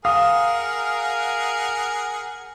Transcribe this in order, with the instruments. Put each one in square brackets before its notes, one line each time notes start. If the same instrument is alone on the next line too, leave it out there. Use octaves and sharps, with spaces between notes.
[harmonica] G#4 F#5 [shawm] A#4 [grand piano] F5 D#6